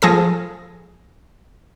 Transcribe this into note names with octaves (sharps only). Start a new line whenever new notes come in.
F3 G#4 A4 A#6